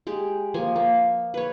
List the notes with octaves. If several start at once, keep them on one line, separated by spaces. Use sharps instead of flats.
G#3 G4
F3 A#3 G#5
A#3
B4 C#5